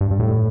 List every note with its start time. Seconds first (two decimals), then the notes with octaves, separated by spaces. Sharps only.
0.01 G2
0.11 G2
0.20 A2